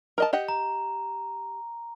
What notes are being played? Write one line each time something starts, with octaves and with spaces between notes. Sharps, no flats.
A#4 D#5 A5
G4 D#5 F#5
A#5